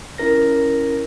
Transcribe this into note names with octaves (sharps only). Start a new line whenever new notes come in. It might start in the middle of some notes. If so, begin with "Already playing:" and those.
C#4 E4 A#4 A#6